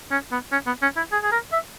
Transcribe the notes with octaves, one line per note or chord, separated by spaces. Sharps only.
C#4
B3
C#4
B3
C#4
E4
G#4
G#4
A#4
E5